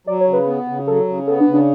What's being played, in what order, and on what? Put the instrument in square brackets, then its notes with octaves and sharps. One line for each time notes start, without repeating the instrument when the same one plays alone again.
[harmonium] F#3 [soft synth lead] D5
[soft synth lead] C#5
[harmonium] C#3
[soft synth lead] B4
[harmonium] B3
C#3
[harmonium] F#3 [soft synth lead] A4
[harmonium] C#3
[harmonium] B3 [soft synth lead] A4
[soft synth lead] D4
[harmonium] C#3
[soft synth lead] D4